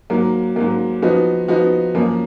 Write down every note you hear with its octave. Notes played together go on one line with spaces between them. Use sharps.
G#2 F#3 A#3
G#2 F#3 A#3
F3 B3 D#4 F#4
F3 B3 D#4 F#4
F#2 F3 A#3 C#4